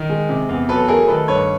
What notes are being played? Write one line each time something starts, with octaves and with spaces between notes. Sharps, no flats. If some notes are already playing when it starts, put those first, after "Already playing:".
Already playing: D#3
G#3
C3
E2
F#3 A4 B4
A3 G#4 A#4
D#3 A4 B4
G2 B4 C#5